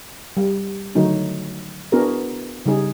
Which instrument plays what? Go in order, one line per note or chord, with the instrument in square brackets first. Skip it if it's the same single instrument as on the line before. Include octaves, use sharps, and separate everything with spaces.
[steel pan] G3
D3 D#3 F#3 A3 D#4 F#4
B3 D4 E4 F#4 G#4 A#4
C#3 G3 D#4 G#4